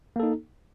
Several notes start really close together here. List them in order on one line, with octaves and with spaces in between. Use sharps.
A#3 A4 D#4